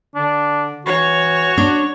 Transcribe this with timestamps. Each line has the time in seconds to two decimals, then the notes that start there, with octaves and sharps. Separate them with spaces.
0.16 D3 D4
0.86 E3 F#4 C#5
1.57 D4